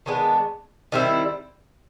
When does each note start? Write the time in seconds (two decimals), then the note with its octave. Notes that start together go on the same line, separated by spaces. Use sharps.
0.06 D#3 G#3 B3 D4
0.92 D#3 G3 C4 E4